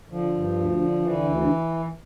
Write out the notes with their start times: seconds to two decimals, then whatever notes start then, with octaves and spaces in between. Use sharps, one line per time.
0.09 D3 F3
0.33 G2
0.56 D2
0.79 D3
1.02 D3 E3
1.25 D2